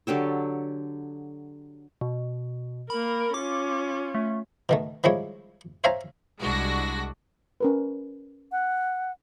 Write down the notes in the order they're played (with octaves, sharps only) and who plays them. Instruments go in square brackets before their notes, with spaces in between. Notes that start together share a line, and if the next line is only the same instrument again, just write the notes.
[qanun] D3 F#3 G4 A4
[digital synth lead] B2
[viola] A#3 A#4 [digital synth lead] B5
[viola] C#4 F4 [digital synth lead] D6
[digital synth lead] A3
[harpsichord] B2 D#3 A3
D#3 F3 G3 G#3 E4 C#5
C5 C#5 E5 F5 G#5 A#5
[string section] C2 G#3 D4 E4 F#4 A#6
[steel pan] C#4 A#4 B4
[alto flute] F#5